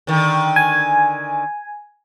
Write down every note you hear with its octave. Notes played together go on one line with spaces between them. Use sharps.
D3 D#3
G#5